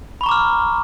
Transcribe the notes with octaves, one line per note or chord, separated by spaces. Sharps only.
A#5 B5 C#6 D6 F6